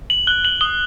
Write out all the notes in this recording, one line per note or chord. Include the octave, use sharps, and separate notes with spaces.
F#7
F#6 G7
F#7
D#6 G7